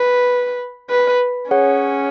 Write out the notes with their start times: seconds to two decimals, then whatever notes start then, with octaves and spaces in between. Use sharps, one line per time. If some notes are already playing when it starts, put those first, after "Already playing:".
Already playing: B4
0.90 B4
1.51 C#4 G#4 C#5 F#5